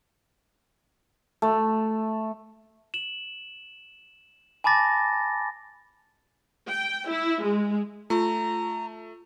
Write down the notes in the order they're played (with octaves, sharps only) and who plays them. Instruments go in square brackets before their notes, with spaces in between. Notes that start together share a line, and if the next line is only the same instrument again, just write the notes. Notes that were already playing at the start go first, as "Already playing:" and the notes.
[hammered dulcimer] A3
[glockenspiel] E7 F#7
G#5 A5 B5 D6 A6 A#6
[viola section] G5
E4
G#3
[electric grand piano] A3 [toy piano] F4 C#6 [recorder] A#5